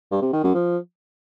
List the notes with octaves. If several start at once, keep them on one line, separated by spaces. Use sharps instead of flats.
G2
C3
D#3
F#2
F3